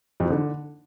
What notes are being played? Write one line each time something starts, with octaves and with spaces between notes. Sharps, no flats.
F2
F3
D3